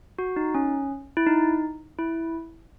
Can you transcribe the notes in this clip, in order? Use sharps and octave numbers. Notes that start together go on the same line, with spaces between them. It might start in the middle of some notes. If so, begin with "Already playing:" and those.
F#4
D#4
C#4
E4
D#4
E4